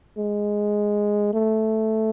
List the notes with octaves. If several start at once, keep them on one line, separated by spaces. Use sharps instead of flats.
G#3
A3